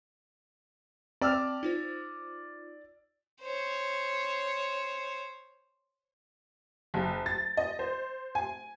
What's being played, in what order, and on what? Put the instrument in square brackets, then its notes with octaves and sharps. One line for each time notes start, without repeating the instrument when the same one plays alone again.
[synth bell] C4 G5 A5 [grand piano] D5 E6 F6
[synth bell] D#4 F4 C5
[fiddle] C5 C#5
[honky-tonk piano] F#1
A6
D#5
C5
G#5